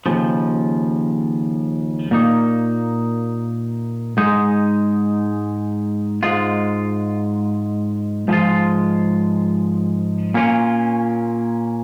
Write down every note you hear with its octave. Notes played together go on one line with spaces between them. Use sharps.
D#2 C#3 F3
A#2 A#3 D#4
G#2 G#3 D#4
G#2 G#3 F4
G#2 F3 G#3 F4
A#2 A#3 C#4 F4